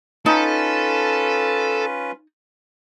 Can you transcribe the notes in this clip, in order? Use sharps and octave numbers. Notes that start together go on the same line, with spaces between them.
C#4 D#4 F4 A4 B4